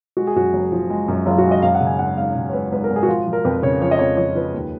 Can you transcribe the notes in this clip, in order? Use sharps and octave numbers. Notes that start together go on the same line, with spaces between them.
G#3 F#4
G#4
F#2 F#4
F#1
F3
G#3
F#2
F#1 F4
F#4
G#3
D#5
F#2 F5
F#5
C#3
G#5
G#1 F#5
G#1 F5
C#3
C#5
G#1 B4
G#1 B4
A#4
G#1
G#4
F#4
F3 F4
F3
A#4
F2 B4
C#3 C#5
F3 C#5
D#5
F2 C#5
F3 C#5
F3 B4
D#2